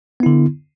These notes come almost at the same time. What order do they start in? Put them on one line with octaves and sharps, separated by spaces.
B3 E4 D3